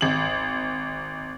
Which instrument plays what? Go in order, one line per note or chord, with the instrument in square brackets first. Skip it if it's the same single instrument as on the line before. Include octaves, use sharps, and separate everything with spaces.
[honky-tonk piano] G#1 F#7